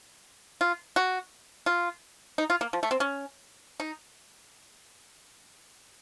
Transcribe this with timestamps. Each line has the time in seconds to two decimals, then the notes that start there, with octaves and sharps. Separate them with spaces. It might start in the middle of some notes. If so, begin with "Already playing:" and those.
0.61 F4
0.96 F#4
1.66 F4
2.38 D#4
2.50 F4
2.61 A#3
2.73 F3
2.83 A3
2.91 C4
3.00 C#4
3.80 D#4